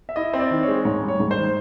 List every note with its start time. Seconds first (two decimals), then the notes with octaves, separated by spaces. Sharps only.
0.09 E5
0.16 E4 D#5
0.33 C4
0.40 D5
0.51 D#3
0.63 G#3 C#5
0.85 G#2 C#5
1.03 G3
1.08 C#5
1.20 G#2
1.31 C5
1.37 D#3